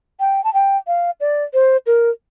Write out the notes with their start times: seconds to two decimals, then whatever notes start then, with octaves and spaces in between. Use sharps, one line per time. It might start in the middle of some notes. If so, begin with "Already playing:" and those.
0.20 G5
0.44 A5
0.54 G5
0.87 F5
1.20 D5
1.54 C5
1.86 A#4